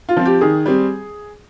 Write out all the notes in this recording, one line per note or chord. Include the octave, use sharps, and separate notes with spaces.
F4
F3 C4
G4
D#3 G#4
G3 C4